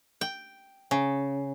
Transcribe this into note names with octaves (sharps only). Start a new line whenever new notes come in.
G5
C#3